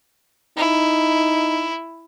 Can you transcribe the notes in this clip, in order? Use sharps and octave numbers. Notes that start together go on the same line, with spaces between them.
D#4 E4